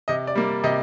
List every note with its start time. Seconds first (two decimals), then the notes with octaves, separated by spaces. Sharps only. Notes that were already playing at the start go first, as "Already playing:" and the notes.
0.08 C3 D#5
0.27 D5
0.35 G3 A#3
0.64 C3 D#5